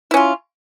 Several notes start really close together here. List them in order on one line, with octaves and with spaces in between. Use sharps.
E4 C#4 F4